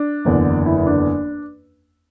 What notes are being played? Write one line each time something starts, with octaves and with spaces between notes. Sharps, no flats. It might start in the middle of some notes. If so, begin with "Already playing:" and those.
Already playing: D4
F#1 E2 D3
E4
E4
D4